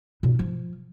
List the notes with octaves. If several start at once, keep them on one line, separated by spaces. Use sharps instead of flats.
B2 D#4
F3